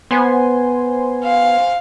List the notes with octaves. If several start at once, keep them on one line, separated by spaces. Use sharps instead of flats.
B3 C5 G#5 C6
F5